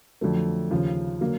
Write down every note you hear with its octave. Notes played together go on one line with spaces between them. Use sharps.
F2 D3 F#3 A3
D#2 C#3 F3
D3 F#3 A#3